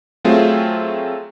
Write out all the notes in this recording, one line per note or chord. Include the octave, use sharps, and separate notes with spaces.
F#3 A3 C4 F4 G#4 E5